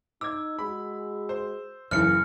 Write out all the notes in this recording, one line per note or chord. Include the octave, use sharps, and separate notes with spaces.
D#4 D6 E6 G#6
G#3 F#4 G#4 B5
C5
F#1 C#3 E3 F6 C#7